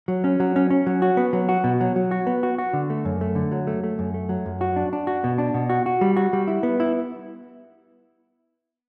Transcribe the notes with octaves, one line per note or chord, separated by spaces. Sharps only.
F#3
C#4
F#3
C#4
C#4
F#3
F#4
B3
F#3
F#4
B2
F#3
F#3
F#4
B3
F#4
F#4
D3
A3
F#2
A3
D3
F#3
A3
A3
F#2
A3
F#3
F#2
F#4
D4
D4
F#4
B2
D4
B2
F#4
F#4
G3
F#4
G3
E4
B3
E4